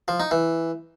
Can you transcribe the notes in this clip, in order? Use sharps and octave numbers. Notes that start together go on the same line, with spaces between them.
F3
D#4
E3